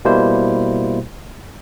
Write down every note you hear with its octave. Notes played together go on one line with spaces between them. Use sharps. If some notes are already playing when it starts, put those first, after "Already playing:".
B2 G3 A#3 E4 C5